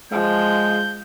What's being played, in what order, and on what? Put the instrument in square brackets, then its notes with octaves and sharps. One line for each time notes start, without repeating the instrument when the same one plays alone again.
[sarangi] F3 [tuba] G#3 [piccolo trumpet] G6